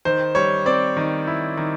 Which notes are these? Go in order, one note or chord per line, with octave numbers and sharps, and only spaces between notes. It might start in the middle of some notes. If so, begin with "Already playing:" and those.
D#3 C5
G3 C#5
C4 D5
D#3
E4
D#3